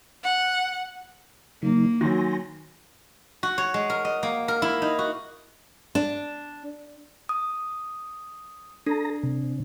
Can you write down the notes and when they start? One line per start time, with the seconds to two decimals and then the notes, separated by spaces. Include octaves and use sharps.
0.23 F#5
1.63 C#3 F#3 A#3 D#4
2.01 D#3 F#3 G#5 C6 A#6
3.43 F#4
3.58 C#5
3.74 G#3
3.90 A#4
4.05 D#5
4.23 A#3
4.48 A#4
4.62 E4
4.82 D#4
4.99 F#4
5.95 D4
7.29 D#6
8.86 D4 A4 A#5
9.23 C3